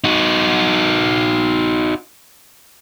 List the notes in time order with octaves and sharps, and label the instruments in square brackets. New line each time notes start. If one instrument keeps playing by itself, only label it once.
[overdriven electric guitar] D#4 F#4